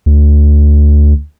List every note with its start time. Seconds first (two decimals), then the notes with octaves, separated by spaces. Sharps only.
0.06 D2